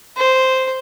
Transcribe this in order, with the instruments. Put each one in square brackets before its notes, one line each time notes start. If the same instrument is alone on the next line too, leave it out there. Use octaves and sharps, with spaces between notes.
[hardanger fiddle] C5